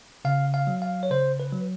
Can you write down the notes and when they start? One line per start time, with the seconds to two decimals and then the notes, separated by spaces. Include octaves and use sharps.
0.25 C#3 F5
0.54 F5
0.67 F#3
0.82 F5
1.03 C#5
1.11 C#3 C5
1.40 B4
1.53 F#3